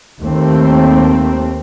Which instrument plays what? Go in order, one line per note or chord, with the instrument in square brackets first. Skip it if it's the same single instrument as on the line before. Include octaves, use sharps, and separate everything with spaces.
[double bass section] D#2 A3 C4